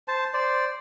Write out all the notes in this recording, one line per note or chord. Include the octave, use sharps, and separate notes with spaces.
C5 A5
C5 D5